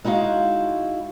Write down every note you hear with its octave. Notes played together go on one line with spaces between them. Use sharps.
G#3 D#4 E4 F#4 F5